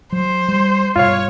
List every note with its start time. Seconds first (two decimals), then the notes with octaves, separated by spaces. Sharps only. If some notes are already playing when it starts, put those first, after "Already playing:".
0.12 F#3 C5
0.48 G3
0.96 G2 B2 F4 C#5 F5